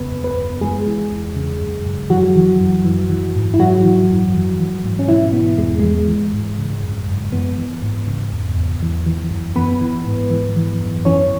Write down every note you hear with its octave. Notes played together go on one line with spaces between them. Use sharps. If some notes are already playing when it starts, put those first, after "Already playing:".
Already playing: E2 C#3 B3 B4
F#2
B3 B4
F#2
E3 G#3 G#4
E3
E2
C#3
F#2
F#2
E3 F#3 F#4
E3
F#2
E3
E3
G#2
E4
E3 F#3 F#4
E3
F#2
E3
E3
G#2
C#4
B2 E3 E4
B2 B3
E2 G#3
E3 G#3
E3
G#2
C#3
F#2
F#2
E3 B3
E3
G#2
C#3
E2
E2
E3
E3
F#2
E3 B3 B4
E3
G#2
E3
E3
F#2
E3 C#4 C#5